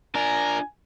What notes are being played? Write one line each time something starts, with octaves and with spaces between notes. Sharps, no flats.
D4 F4 A#4 D5 G#5